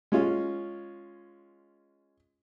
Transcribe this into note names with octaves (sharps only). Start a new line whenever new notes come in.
G#3 C#4 F4